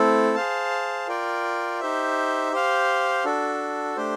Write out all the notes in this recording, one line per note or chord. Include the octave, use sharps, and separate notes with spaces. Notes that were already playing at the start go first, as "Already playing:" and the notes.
Already playing: A3 C4 E4 A4
G#4 C5 F5 A5
F4 A#4 D5 G5
D#4 G4 C5 E5
G4 C5 F5
D4 F#4 A4
A3 D4 G4 C5